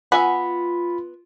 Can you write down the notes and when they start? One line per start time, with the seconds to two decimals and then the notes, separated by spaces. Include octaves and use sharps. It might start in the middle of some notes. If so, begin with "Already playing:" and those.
0.12 B3 F4 E5 F#5 G#5 B5